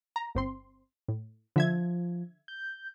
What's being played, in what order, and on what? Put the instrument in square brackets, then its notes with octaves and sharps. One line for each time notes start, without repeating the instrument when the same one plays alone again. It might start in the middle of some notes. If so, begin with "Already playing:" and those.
[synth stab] A#5
G1 C4 C6
A2
[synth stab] D3 E5 G#6 [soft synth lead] F3
[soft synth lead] G6